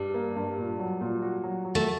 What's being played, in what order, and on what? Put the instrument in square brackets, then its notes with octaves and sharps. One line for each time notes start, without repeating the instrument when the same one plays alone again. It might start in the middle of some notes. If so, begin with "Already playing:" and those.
Already playing: [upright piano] G2 [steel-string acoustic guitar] G3
[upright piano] A#3
G2
A#2
F#3
A#2
F#4
F#3
F#3
[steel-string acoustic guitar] A3